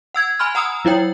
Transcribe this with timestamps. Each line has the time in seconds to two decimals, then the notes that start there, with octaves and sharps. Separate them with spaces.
0.14 F#5 E6 G#6
0.39 G#5 B5 C6 F6
0.55 F#5 A#5 D#6 E6
0.85 F#3 E4 C#5 G5